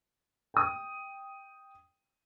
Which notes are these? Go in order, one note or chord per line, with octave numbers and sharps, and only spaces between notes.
G5 D#6